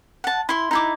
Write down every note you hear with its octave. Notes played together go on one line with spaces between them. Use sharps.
F#5 A5
E4 C6
D#4 E4 D6